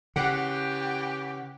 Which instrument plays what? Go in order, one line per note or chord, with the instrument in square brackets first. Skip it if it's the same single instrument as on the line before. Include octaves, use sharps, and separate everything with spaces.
[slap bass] C#3 [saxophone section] E3 G4 [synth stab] F#5